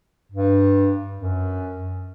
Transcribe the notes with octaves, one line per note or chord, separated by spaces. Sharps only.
G2
F#2